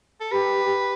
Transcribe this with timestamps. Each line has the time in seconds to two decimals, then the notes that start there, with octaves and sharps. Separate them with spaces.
0.20 A4
0.32 G4 B4